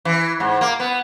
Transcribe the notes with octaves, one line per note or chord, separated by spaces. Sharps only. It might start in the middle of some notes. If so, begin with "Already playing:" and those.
E3
G#2
A#3
B3